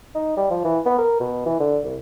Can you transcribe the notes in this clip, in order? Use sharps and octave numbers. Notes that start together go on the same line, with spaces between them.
D#4
G3
F3
E3
B3
A#4
B2
E3
D3
C2